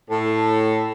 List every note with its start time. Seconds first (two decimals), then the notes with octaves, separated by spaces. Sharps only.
0.10 A2 A4